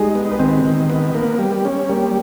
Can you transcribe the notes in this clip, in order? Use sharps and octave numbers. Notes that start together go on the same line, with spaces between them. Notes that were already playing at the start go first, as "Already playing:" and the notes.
Already playing: G3 G#3 D#4 G4 G#4
B3
B4
D#3 C4 C5
D#3
B3
A#3
G3
C#4
G3 A#3 A#4